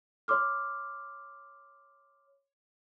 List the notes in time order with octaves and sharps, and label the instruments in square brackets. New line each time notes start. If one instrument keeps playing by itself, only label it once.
[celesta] C#5 C6 D6 F6